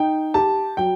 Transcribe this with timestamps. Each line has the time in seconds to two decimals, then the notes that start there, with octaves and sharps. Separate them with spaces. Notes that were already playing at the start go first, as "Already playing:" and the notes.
Already playing: D#4 G5
0.34 G4 A5
0.77 F#3 G5